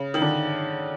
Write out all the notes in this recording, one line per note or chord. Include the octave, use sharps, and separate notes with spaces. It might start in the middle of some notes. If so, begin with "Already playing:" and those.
Already playing: C#3
D#3
D3